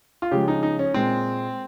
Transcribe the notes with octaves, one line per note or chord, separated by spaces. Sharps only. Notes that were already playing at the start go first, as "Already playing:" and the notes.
F4
C#3 F3 G#3 G4
D#4
D#4
C#4
A#2 G#3 C4